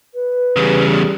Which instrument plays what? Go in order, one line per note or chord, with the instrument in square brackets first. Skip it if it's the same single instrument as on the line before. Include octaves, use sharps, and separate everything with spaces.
[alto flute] B4
[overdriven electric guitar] E2 C#3 [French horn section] G3 G4 G#4